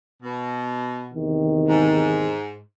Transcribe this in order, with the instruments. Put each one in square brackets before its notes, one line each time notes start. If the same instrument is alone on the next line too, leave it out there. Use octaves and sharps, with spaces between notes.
[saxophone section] B2
[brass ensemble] E2 C3 D#3
[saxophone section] G#2